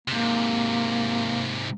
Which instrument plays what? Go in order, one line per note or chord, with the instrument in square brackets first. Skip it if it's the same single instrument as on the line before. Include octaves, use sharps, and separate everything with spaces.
[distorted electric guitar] G#2 C3 [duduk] A#3